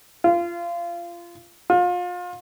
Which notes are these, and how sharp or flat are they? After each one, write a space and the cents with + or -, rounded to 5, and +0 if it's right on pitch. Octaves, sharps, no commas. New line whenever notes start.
F4 -20
F4 +35